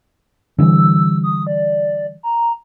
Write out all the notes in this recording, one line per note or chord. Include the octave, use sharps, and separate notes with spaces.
D3 E3 G3 E6
D#6
D5
A#5